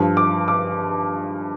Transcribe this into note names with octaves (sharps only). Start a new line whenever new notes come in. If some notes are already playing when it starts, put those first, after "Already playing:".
Already playing: G2 F3
D6
D6